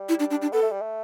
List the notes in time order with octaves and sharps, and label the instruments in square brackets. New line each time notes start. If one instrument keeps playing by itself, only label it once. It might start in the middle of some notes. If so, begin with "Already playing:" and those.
Already playing: [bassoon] G3
[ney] E4
D4
D4
D4
[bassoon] B3 [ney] A4
[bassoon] A3
G3
A3